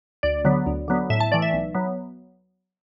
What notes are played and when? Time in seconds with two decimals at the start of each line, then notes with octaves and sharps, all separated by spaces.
0.23 D2 D5
0.45 D3 F#3 B3
0.66 D2
0.88 D3 F#3 B3
1.10 A2 E5
1.20 A5
1.31 E3 A3 D5
1.42 E5
1.53 B1
1.75 F#3 B3